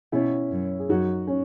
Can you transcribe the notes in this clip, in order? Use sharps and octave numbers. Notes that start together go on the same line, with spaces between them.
B2 C#4 E4
F#2
G#4
F#2 D#4 F#4
C#4